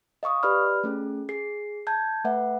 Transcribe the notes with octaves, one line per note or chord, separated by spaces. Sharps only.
D#5 F5 C#6 D#6
G4 B4 D5 B5 F6
A3 C#4 G#4
G#4 C7
A5 G6 G#6
A3 B4 E5 F#5